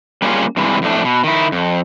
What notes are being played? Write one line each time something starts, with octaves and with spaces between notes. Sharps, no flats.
G3 A#3 C#4 D#4 F4 G#4
G2 C3 E3 G#3
F2 A2 A3 D4
B2
D#3 E4
F2